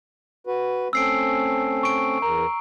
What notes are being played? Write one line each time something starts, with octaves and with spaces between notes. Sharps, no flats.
F#4 B4
A3 C4 C#4 E6 C7 D7
C#6 D7
E2 A#4 A#5